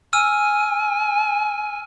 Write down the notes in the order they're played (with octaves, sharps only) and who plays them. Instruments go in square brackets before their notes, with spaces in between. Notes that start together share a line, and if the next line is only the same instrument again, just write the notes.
[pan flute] G#5 [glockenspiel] E6 F6 D#7